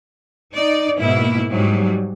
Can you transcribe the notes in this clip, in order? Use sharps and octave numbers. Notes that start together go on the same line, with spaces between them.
D#4 D5
G#2 B2 A#3 E4
G#2 F#3 G3